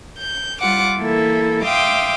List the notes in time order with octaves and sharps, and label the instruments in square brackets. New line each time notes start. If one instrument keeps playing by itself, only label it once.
[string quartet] G6
G3 F4 F#5 D6
E3 A#3 E4 A4
E5 F5 G5 C6 D6 D#6